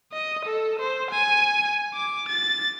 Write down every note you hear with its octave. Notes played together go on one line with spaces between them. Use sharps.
D#5
A4
C5
G#5
D6
A6